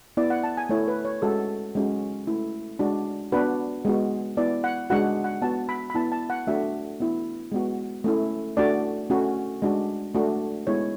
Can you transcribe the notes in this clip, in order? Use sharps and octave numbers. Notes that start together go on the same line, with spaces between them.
B3 E4 D5
F#5
A5
G#5
A3 E4 C#5
B4
C#5
G#3 C#4 F#4 A4
G#3 C#4 F#4
A3 E4
G#3 D4 F#4
B3 D4 F#4 B4
G#3 B3 F#4
B3 E4 D5
F#5
G#3 D4 F#4 F#5
F#5
B3 F#4 A5
B5
B5
B3 E4 A5
A5
F#5
A3 D4 F#4 E5
B3 E4
G#3 B3 F#4
A3 C#4 E4
A3 D4 F#4 D5
A3 C#4 F#4
G#3 D4 F#4
A3 D4 F#4
G#3 B3 E4 C#5